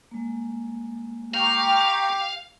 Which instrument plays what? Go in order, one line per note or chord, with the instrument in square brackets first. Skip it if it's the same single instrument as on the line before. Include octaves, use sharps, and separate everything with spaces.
[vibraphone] G#3 A#3
[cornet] G4 [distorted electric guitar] F5 [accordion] G5 A#5 C#6